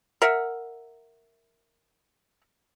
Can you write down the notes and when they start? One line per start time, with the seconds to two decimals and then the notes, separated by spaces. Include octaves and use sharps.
0.22 A#4 E5 F#5